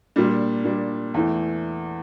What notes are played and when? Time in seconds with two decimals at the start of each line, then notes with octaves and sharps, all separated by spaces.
0.16 A#2 G3 D4
0.65 A#2 G3 D4
1.14 E2 E3 A3